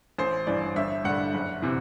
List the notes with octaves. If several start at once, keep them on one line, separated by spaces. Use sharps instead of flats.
A1 C5
G2 E3 D5
G1 E5
G2 D3 F#5
F#1
C3 E3